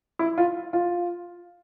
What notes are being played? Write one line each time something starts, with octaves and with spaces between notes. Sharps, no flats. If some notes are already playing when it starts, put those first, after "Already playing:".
E4
F4
F4